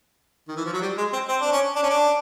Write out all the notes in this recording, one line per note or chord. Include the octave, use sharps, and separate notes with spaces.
D#3
E3
F3
F#3
G3
G#3
C4
C4
D4
C#4
D4
C#4
D4